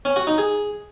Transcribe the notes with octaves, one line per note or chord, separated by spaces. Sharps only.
C#4
F#4
D#4
G#4